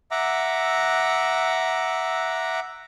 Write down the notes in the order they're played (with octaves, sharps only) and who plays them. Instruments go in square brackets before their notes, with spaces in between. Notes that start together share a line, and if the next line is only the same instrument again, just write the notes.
[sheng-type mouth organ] E5 F#5 A#5 D6